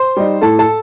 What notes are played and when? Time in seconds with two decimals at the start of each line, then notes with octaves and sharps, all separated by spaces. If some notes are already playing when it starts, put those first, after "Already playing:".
Already playing: C5 C6
0.17 G3 D#4
0.42 A2 A4 A5
0.59 A4 A5